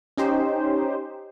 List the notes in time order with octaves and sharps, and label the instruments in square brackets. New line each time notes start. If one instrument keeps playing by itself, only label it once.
[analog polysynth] C#4 D#4 G4 C5